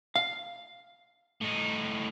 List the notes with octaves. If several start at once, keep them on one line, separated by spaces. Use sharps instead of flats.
F5
A2 D#4